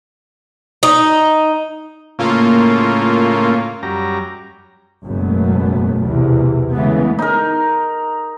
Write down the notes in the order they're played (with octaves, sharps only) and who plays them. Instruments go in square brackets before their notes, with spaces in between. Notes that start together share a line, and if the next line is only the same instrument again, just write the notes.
[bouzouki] D#4
[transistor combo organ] A2 C#3 [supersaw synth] A#3 F4
[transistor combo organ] F#2 G3 A#5
[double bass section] F#1 F#2 B2 G#3 A3 B3
B1 E2 C3 E3
C#3 E3 G#3 A3 B3
[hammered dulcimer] D#4 A#4